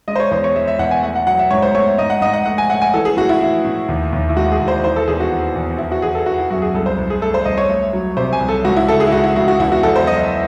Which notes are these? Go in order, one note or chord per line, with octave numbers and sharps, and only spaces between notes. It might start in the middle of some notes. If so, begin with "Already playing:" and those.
G#3 D#5
C5
C#5
E2 C5
C#5
G#3 E5
E5
E2 F#5
G#5
A3 F#5
F#5
F#3 F#5
E5
G#2 C#5
C5
A3 C#5
G#2 D#5
F#5
G#2 D#5
F#5
A3 F#5
G#5
A3 F#5
G#5
E3 A4
G#4
A2 F#4
E4
E3
A2
D#2
D#2
E4
G#3 F#4
G#4
D#2
C5
E3 C5
A4
E2 G#4
F#4
E3
E2
E3 E4
F#4
E3 G#4
A4
E3 F#4
E4
F#2 F#4
G#4
C2 A4
C5
C2
G#4
A3 A4
C5
C2 D#5
C#5
A3
F#3
C3 C5
G#5
C2
A4
C#2 F#4
E4
C#3 A4
G#4
E4
C#2 F#4
E4
C#2 F#4
F#4
E2 E4
F#4
E2 A4
C5
F#3 D#5
E5